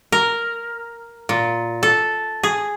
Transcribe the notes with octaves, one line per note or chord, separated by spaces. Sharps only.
A#4
A#2
A4
G#4